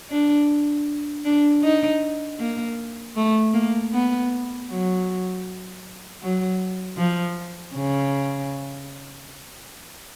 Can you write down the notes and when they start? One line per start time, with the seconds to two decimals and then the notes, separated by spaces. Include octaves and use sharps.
0.10 D4
1.25 D4
1.64 D#4
2.39 A#3
3.17 A3
3.54 A#3
3.93 B3
4.70 F#3
6.22 F#3
6.98 F3
7.75 C#3